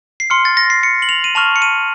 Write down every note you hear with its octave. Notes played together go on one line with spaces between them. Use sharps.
C7
C6 F6 C#7
A6
A#6
C7
C#7
F#7
F7
D#7
A5 C#6 F6 F7
C#7
D#7